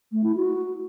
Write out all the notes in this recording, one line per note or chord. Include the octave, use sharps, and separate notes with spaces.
A3
E4
F#4